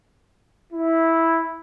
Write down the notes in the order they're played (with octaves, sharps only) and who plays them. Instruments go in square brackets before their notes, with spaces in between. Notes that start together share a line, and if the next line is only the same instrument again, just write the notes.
[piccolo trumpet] E4